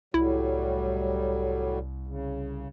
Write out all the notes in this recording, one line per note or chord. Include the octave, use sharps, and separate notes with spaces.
C2 A2 F#3 G3 E4
C#3